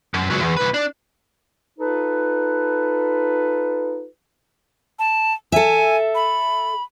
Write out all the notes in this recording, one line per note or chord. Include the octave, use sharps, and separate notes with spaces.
F#2
C#2 F#3
E2
C2 B4
D4
D#4 F4 A4 B4
A5
A4 E5 G#5
B5